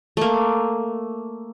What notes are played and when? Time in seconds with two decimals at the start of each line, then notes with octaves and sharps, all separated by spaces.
0.17 A3 A#3